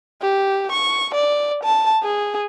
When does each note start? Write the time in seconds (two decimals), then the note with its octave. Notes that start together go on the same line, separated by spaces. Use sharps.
0.22 G4
0.72 C#6
1.15 D5
1.64 A5
2.03 G#4